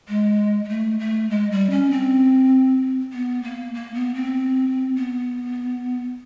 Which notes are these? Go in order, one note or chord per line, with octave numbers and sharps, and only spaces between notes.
G#3
G#3
A3
A3
G#3
G3
C#4
C4
B3
A#3
A#3
B3
C4
B3